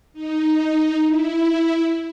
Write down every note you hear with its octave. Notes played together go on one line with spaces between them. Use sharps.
D#4
E4